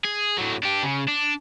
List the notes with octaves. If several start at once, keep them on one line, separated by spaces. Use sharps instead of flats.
G#4
A2 F#3
D4 G4
C#3
D4